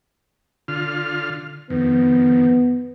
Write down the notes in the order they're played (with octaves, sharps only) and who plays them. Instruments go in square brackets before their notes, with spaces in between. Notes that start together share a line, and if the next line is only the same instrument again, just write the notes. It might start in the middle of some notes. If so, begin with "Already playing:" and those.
[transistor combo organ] D3 F4 F6
[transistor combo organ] F2 D#3 [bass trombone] B3